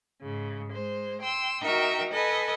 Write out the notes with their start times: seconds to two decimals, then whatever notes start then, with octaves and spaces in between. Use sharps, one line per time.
0.21 G#2 C#3
0.71 G#3 C5
1.21 G5 C6 E6
1.62 D#4 F#4 A#4 E5 G5 A#5
2.13 A4 B4 D#5 G#5